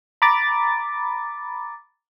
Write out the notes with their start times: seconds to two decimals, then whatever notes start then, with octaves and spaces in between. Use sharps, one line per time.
0.22 A#5 B5 D6 A6